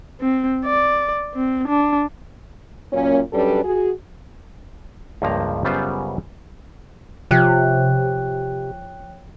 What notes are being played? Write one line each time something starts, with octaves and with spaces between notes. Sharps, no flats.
C4
D5
C4
D4
F#2 A#2 A#3 C#4
F#2 G3 C#4 D4 A4 B4
F#4 G#4
C#2 G2 F3 A#3 A#5
F#2 C#3 G3 B3 F4 C5
C3 F3 C#5 G5 F#6